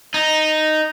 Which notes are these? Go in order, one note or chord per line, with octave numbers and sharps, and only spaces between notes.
D#4